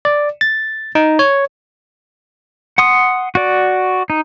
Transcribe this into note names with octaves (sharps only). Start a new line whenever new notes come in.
D5
A6
D#4
C#5
F#5 C6 D#6
F#4 D5
D#4